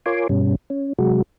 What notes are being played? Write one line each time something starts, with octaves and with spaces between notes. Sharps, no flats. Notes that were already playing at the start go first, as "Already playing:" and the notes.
F4 A#4 C#5 G#5 C6 D6
G2 B2 G3 C#4
C#4
C3 F#3 G#3 F#4